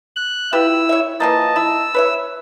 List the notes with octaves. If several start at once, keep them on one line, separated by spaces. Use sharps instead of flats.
F#6
E4 F4 G4 B4 E6
C#5 E5
E3 F3 A#3 D#5 A5
E4 E6
B4 C#5 E5